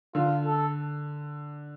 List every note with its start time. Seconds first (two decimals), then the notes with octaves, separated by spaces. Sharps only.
0.15 D3 F4
0.46 A4